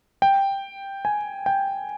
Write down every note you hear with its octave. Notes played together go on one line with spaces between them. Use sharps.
G5
G#5
G5